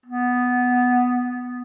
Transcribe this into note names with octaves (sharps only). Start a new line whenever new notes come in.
B3